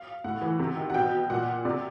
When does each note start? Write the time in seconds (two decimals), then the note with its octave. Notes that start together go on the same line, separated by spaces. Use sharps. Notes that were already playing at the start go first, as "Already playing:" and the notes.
Already playing: F5
0.24 A2 F#5
0.42 E3
0.59 C3
0.77 D#3
0.90 F#5
0.94 B2 G5
1.30 A#2 F#5
1.65 C3 D5